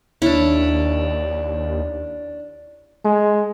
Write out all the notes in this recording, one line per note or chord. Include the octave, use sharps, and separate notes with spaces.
D#2 C#4 D4 E4
G#3